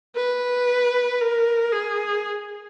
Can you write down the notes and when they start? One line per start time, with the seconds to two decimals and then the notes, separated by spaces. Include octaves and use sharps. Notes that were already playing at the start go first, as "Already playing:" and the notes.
0.16 B4
1.21 A#4
1.72 G#4